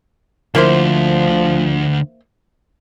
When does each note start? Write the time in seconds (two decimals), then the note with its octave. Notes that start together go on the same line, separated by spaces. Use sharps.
0.55 D2 D3 F3 A#3 E4 C5